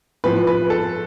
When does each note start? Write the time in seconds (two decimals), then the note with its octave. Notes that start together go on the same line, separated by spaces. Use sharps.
0.24 A2 F3 B4
0.47 B4
0.70 A4